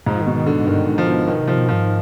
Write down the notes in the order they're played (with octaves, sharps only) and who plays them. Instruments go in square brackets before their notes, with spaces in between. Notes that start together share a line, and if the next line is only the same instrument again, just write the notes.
[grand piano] G#2 [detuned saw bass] F3
[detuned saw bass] D#3
[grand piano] B2
[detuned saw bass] D#3
[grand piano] D3
[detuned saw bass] G#2
[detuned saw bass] G2 [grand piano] D#3
[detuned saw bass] G#2
[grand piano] F3
[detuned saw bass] B2
[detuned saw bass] B2 [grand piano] D#3
[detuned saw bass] C3 [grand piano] F3
[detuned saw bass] B2
[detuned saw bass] G#2 [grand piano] F3